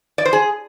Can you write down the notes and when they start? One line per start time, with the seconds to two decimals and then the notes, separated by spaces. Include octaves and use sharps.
0.18 D5
0.25 C5
0.33 G#4